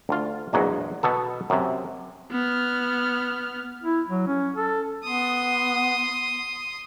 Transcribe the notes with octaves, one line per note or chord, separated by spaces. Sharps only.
D2 F4
A#1 E2 F#3 G#3
B2 B3 A4
F#2 C3
B3 F6
E4
F#3
C#4
A4
B3 C6 D#6